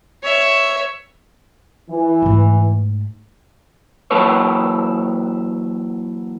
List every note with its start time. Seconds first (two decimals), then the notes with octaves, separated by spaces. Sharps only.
0.23 C#5 E5
1.90 E3
2.22 G#2 A3
4.11 E3 F#3 A#3 A4 B4 C#5